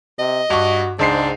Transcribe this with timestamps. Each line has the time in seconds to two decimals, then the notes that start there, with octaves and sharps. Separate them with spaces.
0.19 C3 D#5
0.50 G2 F#4 C#6
0.99 C#2 G#2 D4 C5 C7